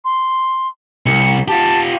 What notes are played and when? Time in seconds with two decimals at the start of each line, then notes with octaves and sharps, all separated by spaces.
0.05 C6
1.06 C2 C#7
1.48 F4 G4 A5